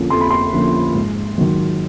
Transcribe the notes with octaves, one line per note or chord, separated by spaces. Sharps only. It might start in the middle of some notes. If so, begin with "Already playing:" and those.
Already playing: F2 D3 F3 A#3 C#4
F2 C6
B5
C6
D3 F3 A#3 C#4
G#2
D#3 F#3